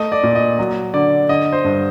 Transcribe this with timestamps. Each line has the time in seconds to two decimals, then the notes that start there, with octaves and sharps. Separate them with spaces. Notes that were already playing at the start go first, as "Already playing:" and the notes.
Already playing: A3 D#5
0.12 D5
0.23 A#2
0.35 D#5
0.59 F#3
0.94 D3 D5
1.29 D3 D#5
1.52 C5
1.64 G2